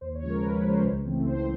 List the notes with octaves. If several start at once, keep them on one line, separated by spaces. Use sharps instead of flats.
D#2 C5
C#5
C#3 F3 G#3
A#4
D#2 B4
C#3 F3 G#3 C5
C#2
C#3 E3 A3 C4
C#2 C5